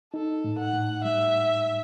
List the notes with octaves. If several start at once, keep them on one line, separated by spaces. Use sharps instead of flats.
D#4 A4
A2
F#5
A2
G3 E5